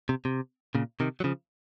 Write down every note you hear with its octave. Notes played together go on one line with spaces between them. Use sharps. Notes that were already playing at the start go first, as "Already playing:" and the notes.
C3
C3
A#2 C#3
C3 D#3
F#3
C#3 F3